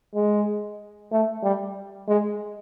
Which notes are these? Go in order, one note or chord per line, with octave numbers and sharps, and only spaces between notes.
G#3
A3
G3
G#3